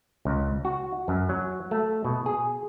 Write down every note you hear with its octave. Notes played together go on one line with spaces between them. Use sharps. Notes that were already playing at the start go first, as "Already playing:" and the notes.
C#2
F#4
F#2
F#3
A3
B2
G#4